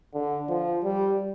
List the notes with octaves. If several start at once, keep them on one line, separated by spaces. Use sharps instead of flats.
D3
F3
G3